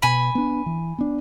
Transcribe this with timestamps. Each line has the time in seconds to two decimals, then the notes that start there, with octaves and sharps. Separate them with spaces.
0.02 B2 G#5 B5
0.35 B3 D4
0.66 E3
0.98 B3 D4